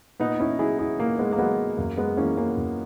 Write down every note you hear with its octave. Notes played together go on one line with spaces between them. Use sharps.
A#2 B3 D#4
C#4 E4
F#3 E4 G#4
E4 G#4
A#2 A#3
G#3 B3
A#3
F#3 G#3 B3
F#2 A#3
G#3 B3
E3 A#3 C#4
A#3 C#4
F#2